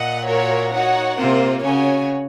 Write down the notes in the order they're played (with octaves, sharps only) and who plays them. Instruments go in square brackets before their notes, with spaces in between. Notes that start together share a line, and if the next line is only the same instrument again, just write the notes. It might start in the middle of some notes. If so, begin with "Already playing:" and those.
Already playing: [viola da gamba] A#2 [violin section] D#5 F#5
[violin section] F#4 A#4 C#5
D#4 F#4 C#5 F#5
[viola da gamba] C3 [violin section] A#3 F4 C5
[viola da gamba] C#3 [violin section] F#4 C#5 G#5